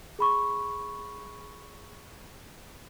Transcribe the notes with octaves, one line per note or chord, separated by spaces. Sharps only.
G#4 B5 C#6